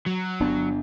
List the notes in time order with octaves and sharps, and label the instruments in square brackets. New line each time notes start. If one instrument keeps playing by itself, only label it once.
[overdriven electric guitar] F#3
[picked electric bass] G1 B3 D4